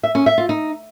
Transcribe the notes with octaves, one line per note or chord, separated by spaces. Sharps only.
E5
C#4
E5
F4
D#4